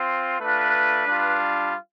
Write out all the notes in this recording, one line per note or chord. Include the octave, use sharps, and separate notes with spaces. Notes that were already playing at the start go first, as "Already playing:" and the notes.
Already playing: C4 F4
A3 D4 F4 B4
G3 D4 F4